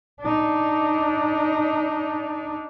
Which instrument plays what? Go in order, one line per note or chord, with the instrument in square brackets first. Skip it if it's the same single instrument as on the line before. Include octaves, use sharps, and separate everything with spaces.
[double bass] D4 D#4